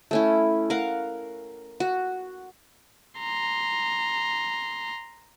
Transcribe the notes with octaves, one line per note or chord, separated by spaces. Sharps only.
A3 C#4 E4
A#4 F5 F#5
F#4
A#5 C6